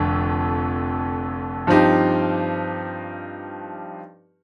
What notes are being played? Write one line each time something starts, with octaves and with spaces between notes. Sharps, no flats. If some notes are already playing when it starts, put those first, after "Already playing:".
Already playing: F1 F2 D3
G2 F3 C4 D#4 G4